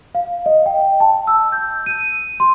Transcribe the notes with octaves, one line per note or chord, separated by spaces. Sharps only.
F5
D#5
G5
A5
E6
G6
D#7
C6